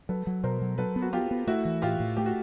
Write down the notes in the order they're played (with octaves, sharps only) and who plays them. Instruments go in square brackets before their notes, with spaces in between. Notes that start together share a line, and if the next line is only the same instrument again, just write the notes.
[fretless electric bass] F#3 [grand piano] A4 B4
[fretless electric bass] F#3
[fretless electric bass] B2 [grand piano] A#4 C5
[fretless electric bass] F#3
[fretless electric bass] F#3 [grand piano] A4 B4
[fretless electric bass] B3
[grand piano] F#4
[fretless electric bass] B3 [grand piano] F4 G4
[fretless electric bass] B3
[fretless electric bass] A3 [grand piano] E4 F#4
[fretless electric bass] E3
[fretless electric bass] A2 [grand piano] F4 G4
[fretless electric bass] A2
[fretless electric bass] A3 [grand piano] G4
[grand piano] F#4